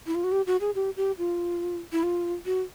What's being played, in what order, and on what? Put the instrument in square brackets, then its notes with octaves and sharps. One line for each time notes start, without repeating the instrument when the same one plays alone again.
[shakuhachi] E4
F4
F#4
G4
F#4
G#4
G4
G4
F4
E4
F4
F#4